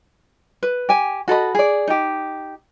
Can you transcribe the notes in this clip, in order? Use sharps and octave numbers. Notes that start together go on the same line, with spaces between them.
B4
G4 G#5
F#4 A4 D#5 B5
G#4 D5
D#4 G4